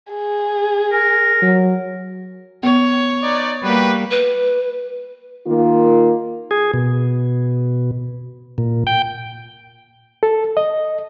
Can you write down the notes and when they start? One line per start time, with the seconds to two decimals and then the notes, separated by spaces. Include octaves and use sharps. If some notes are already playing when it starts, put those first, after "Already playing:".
0.13 G#4
0.91 A#4
1.43 F#3
2.63 B3 C#5
3.23 D#4 B4 D5
3.63 G3 A#3 F#4 G4 B4
4.11 B4
5.46 D#3 A#3 F4
6.51 G#4
6.74 B2
8.58 A#2
8.87 G5
10.23 A4
10.57 D#5